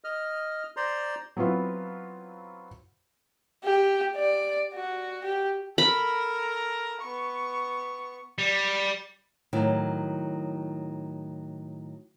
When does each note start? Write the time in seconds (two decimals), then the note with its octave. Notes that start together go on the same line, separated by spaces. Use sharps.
0.04 D#5 F6
0.77 C5 D5 A#5 C6
1.37 F#3 B3 C4 E4 F4
3.64 G4
4.16 D5
4.74 F#4
5.24 G4
5.78 A4 A#4 B5
7.01 B3 C#6
8.38 G3
9.53 A2 D#3 F#3 E4